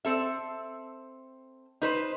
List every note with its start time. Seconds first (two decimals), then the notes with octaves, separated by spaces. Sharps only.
0.05 C4 A4 E5
1.82 D#4 B4 C5